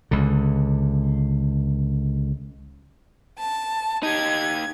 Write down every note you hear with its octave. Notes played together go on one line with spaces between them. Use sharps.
C#2 D3
A5
D#4 G4 G#6